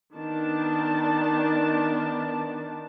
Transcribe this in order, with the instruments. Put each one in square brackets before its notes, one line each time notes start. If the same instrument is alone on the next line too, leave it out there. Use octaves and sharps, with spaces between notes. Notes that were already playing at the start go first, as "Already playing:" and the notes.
[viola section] D#3 B3 D4 A5